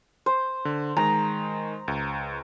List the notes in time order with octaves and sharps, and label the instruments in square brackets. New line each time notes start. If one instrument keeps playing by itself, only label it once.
[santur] C5
[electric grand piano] D3
[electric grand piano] D#3 G#3 [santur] A#5
[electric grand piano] C#2